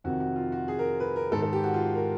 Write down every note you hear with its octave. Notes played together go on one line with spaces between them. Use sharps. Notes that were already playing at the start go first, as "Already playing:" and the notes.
F2 C3 D#3 F#4
F#4
F4
F#4
G#4
A#4
B4
A#4
G#2 D#3 A4
A4
G4
F#4
F4
A#4